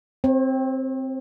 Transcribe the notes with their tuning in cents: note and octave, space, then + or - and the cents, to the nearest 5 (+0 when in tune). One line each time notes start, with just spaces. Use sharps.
C4 +0 C#5 -45